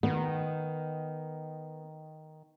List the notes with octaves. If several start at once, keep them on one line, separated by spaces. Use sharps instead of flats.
D#3 B3